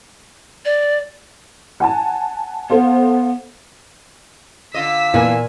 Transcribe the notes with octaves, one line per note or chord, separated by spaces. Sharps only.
D5
F#5 G#5 A5
B3 A4 C5 F5
D3 F4 D#5 E6 B6
A#2 E3 A#3 B3 G#5